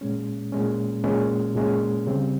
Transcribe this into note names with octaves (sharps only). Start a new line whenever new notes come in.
A#2 G#3 C#4
A#2 G#3 C#4
A#2 G#3 C#4
A#2 G#3 C#4
C#3 G3 C4